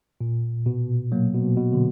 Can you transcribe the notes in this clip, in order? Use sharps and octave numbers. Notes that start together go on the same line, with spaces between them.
A#2
B2
F#3 A#3
B2
B2
D3